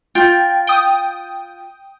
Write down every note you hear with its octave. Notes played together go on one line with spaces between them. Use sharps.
F4 G5
G5 D#6